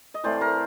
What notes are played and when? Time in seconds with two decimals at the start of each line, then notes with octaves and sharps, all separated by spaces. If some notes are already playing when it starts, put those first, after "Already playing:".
0.14 D#5
0.24 A2 E3 A3 C4 C5 D5
0.41 A#4 C5